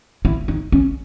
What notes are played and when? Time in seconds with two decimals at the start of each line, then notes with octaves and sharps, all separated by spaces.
0.25 E4
0.48 D#4
0.72 C#4